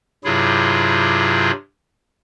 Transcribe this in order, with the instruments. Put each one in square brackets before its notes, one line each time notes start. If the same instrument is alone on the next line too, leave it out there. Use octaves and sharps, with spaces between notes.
[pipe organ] G2 C3 F#3 E4 F4 G#4